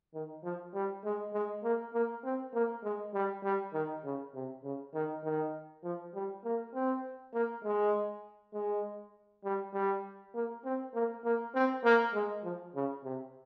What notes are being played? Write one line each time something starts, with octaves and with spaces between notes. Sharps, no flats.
D#3
F3
G3
G#3
G#3
A#3
A#3
C4
A#3
G#3
G3
G3
D#3
C#3
C3
C#3
D#3
D#3
F3
G3
A#3
C4
A#3
G#3
G#3
G3
G3
A#3
C4
A#3
A#3
C4
A#3
G#3
F3
C#3
C3